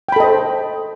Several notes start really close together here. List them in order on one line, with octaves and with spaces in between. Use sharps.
G5 B5 A4 D#5 C5